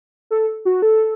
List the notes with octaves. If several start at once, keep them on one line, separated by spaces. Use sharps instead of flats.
A4
F#4
A4